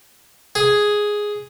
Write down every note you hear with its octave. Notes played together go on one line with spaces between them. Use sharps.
G#4